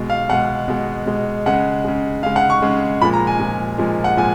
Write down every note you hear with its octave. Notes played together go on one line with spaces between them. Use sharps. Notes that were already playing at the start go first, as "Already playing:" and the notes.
Already playing: B2 G#3
F5
B2 G#3 F#5
B2 G#3
B2 G#3
C#3 G#3 F#5
C#3 G#3
C#3 G#3 F5
F#5
C#6
C#3 G#3
A#2 F3 G#3 B5
A#5
G#5
A#2 F3 G#3
A#2 F3 G#3
F#5
A#2 F3 G#3 G#5